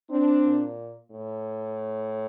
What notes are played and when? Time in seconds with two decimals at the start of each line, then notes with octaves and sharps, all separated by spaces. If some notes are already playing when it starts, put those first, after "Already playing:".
0.10 C4 D4
0.44 A#2
1.11 A2